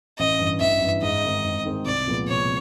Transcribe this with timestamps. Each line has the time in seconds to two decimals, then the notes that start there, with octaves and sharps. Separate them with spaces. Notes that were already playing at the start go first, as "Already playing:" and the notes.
0.18 A1 D#5
0.39 G2 E3
0.60 A1 E5
0.81 G2 E3
1.02 G#2 D#5
1.24 D#3 G#3 C4
1.44 G#2
1.65 D#3 G#3 C4
1.86 C2 D5
2.07 A#2 F3 G#3 B3
2.28 C2 C#5